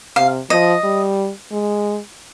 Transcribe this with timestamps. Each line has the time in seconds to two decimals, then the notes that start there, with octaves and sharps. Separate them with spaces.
0.16 C3 F5
0.50 F3 D#5
0.84 G3
1.51 G#3